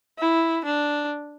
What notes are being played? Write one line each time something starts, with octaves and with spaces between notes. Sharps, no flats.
E4
D4